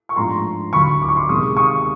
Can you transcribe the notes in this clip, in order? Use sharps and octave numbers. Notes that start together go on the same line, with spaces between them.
C#6
G#2 F3 A3 D4 A#5 C6
D2 D3 F#3 B5 C#6
D6
C#6
C6 D6
C3 D#3 G#3 C#6 D#6
C#6 D#6